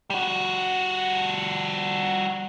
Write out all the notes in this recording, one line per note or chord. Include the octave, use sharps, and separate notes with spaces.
G3 F#4